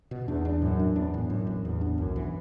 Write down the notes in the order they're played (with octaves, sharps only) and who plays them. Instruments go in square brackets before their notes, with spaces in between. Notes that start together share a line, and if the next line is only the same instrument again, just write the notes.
[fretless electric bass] B2
[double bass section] E2 [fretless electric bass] D4
[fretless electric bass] D4
[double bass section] F#2 [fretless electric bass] A2
[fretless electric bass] D4
[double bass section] E2 [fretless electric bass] D4
[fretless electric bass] A2
[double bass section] F#2 [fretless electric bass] A2
[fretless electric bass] A1
[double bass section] E2 [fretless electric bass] A2
[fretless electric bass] D4
[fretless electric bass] B1 [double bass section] F#2
[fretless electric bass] E3